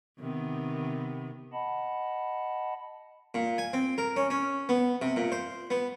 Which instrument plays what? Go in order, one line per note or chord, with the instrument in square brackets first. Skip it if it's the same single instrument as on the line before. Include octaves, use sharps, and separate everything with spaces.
[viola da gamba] C3 D#3 B3
[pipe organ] D#5 F#5 A5 B5
[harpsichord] A#2
G#5
C4
A#4
C#4
C#4
B3
C3
A#2
C5
B3